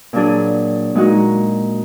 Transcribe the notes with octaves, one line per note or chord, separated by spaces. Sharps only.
A#2 F#3 D4 G#4
A#2 G#3 D#4 F#4